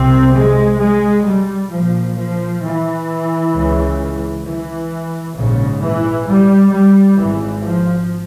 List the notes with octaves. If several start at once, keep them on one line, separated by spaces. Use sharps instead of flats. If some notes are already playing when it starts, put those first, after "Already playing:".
Already playing: C2 C3 C4
G#3
G#3
G3
A#1 A#2 F3
F3
E3
C#2 C#3
E3
A#1 G#2 C#3
E3
G3
G3
G#1 G#2 E3
F3